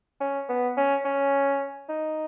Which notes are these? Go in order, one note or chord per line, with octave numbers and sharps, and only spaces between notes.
C#4
B3
C#4
C#4
D#4